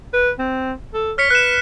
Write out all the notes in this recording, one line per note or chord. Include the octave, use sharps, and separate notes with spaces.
B4
C4
A4
C#5 F6 B6 C#7
B4 F#6 E7